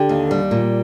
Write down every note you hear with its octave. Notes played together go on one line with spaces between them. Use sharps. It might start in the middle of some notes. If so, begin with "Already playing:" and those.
Already playing: D3 G4
D#2
G3
A#2